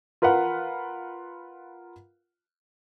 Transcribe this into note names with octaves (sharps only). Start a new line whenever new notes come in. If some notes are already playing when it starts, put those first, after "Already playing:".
F4 A#4 B4 F5 F#5